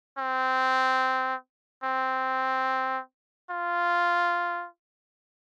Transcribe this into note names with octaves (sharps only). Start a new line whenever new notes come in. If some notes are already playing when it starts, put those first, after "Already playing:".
C4
C4
F4